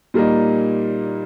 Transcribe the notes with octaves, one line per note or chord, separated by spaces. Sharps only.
A#2 G3 A#3 D#4